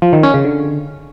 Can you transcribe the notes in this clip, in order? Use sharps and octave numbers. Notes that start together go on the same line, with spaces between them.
F3
D#3
C#4
C#3
D3